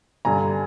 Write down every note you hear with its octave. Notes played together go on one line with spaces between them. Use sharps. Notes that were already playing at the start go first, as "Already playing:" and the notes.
G2 D3 G3 G#5 A#5